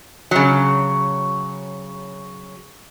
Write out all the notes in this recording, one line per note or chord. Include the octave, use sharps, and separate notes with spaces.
C#3 F#3